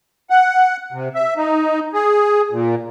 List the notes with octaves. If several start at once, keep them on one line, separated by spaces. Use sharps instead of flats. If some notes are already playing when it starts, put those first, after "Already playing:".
F#5
C3
E5
D#4
G#4
A#2